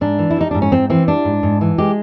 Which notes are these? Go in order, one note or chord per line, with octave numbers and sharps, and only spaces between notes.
G#2 D4
E3
E4
G3 D#4
G#2 D4
C#4
G#2 C4
E3 C4
G3 D4
G#2
G#2
E3
G#3 G4